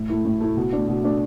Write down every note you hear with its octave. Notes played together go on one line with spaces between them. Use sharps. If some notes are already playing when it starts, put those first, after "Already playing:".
Already playing: A2
A3 E4
A2
A3 E4
B2
A3 D4
B2
A3 D4